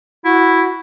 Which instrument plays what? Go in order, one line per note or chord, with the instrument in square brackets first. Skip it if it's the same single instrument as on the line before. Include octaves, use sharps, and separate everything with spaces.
[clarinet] E4 [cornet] F#4